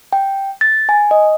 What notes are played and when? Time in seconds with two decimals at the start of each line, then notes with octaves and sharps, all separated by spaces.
0.13 G5
0.61 A6
0.89 G#5
1.11 D#5